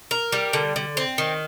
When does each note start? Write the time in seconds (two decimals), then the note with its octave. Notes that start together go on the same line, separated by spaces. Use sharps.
0.11 A#4
0.32 G3
0.53 D3
0.76 D3
0.97 C4
1.18 D#3